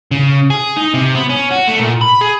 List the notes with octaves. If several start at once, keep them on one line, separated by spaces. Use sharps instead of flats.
C#3
G#4
D#4
C3
B3
C#4
F#4
A3
A#2
B5
G#4